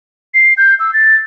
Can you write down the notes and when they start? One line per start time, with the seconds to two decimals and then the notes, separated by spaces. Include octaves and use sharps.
0.34 C7
0.57 G6
0.80 E6
0.94 A6